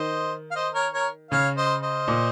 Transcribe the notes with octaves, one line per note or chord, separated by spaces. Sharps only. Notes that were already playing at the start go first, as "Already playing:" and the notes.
Already playing: D#3 C5 D#5
F5
C5 D#5
A#4 C#5
A#4 C#5
C#3 C#5 F5
C5 D#5
C5 D#5
A#2